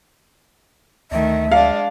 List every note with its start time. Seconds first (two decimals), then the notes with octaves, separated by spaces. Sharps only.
1.12 D2 D#3 A3 E5
1.52 G#3 D4 F5